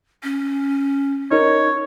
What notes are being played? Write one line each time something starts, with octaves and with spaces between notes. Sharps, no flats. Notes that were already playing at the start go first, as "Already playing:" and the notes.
C#4
D#4 A#4 C#5